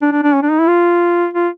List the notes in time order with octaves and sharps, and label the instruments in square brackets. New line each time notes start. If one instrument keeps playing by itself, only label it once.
[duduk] D4
D4
D4
C#4
D4
D#4
E4
F4
F4